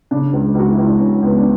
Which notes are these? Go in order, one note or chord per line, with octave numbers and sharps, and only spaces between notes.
C#3 D4
C#2
C#2 F#4
E4
C#2
D4
C#2 C#4
C#2 B3
D4